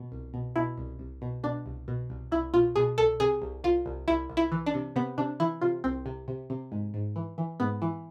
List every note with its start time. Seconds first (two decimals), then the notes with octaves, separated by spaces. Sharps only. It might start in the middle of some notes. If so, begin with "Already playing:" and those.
Already playing: B2
0.12 C2
0.34 B2
0.56 B2 E4
0.77 C2
0.99 C2
1.22 B2
1.43 B2 D4
1.66 C2
1.88 B2
2.10 C2
2.32 C2 E4
2.54 B2 F4
2.76 B2 G#4
2.98 C2 A4
3.20 C3 G#4
3.42 C2
3.64 C2 F4
3.86 C2
4.08 C2 E4
4.30 C2
4.37 E4
4.52 E3
4.66 D4
4.74 C3
4.96 C3 B3
5.18 C3 D4
5.40 E3 E4
5.61 C3 F4
5.84 C2 C4
6.06 C3
6.28 C3
6.50 C3
6.72 G#2
6.94 G#2
7.16 E3
7.38 E3
7.60 G#2 B3
7.82 E3